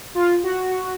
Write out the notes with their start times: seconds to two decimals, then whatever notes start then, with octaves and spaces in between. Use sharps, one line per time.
0.15 F4
0.44 F#4